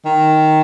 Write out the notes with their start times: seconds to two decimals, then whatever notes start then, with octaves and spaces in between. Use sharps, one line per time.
0.05 D#3